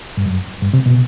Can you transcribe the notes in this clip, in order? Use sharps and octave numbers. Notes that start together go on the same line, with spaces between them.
G2
F#2
G2
C3
B2